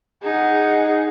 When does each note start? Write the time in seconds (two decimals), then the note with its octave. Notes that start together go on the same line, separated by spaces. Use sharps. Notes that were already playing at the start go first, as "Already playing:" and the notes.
0.23 D#4 G#4 F#5